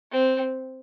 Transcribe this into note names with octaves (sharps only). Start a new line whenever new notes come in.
C4